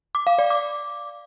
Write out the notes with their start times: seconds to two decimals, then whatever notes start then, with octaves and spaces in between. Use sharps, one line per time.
0.15 D6
0.27 F5
0.39 D5
0.50 D6